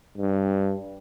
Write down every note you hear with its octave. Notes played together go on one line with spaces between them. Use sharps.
G2